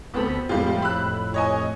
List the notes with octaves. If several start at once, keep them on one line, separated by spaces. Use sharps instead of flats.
D2 B3 C4 A4 B5
F2 A2 G3 G#3 F4
B5 E6 F#6
C#5 D#5 G#5